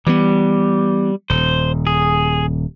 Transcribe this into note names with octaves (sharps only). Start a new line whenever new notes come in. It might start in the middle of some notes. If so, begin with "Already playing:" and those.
E3 G3 B3
D#1 C5
G#4